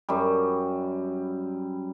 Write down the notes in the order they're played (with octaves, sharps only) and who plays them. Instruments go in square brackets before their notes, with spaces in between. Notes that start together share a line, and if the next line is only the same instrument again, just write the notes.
[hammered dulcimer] F#2 G3